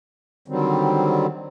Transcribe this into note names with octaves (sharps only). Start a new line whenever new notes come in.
D3 D#3 F#3 G3 C4